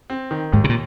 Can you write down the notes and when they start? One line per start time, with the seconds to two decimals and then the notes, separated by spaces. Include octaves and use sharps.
0.10 C4
0.31 D#3
0.52 D#2 G#2
0.64 C3
0.69 A#2